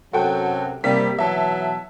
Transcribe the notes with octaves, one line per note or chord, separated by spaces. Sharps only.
F#2 C3 F#3 F#4 A4 G5
C3 G3 A#3 B6
B2 E3 F#3 E5 A5